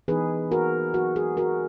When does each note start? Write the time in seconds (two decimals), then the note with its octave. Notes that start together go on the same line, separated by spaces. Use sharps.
0.08 E3 B3 D#4 G#4 B4
0.51 F#4 A#4
0.94 F#4
1.16 G#4
1.37 F#4 A#4